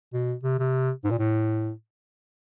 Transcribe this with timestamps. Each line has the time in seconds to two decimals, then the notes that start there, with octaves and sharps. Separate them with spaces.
0.13 B2
0.43 C3
0.59 C3
1.04 G#2
1.11 A#2
1.19 A2